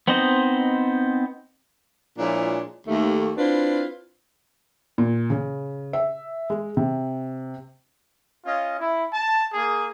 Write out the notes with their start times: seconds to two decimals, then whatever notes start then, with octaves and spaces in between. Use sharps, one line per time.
0.08 B3 C4 D#4 C5 D#5
2.18 A#2 F3 G#3 D4 E4 C#5
2.88 D#2 A3
3.38 C4 D4 E4 F4 B4 C5
4.98 A#2
5.30 C#3
5.93 E5
6.50 G#3
6.77 C3
8.45 C#4 F4 D#5
8.80 E4
9.14 A5
9.54 A#3 G#4